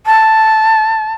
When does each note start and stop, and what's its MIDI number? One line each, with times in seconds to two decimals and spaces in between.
0.06 1.14 81